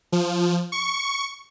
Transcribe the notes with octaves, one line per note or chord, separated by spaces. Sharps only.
F3
C#6